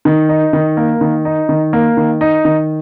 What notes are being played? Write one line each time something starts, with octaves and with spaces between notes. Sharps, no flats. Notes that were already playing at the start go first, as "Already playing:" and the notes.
D#3
D#4
D#3
A#3
D#3
D#4
D#3
A#3
D#3
D#4
D#3